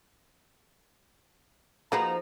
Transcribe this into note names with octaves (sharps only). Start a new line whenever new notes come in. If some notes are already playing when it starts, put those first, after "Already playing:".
F3 A#3 D#4 F#4 G#4 B4 A#5